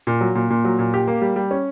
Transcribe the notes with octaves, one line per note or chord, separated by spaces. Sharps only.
A#2
F#3
A#2
A#2
F#3
A#2
G4
A#3
G3
G3
C#4